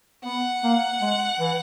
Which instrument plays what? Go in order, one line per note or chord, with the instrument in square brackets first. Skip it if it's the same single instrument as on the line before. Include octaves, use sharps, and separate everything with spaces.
[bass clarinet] B3 [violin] F#5
[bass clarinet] A#3
G#3
E3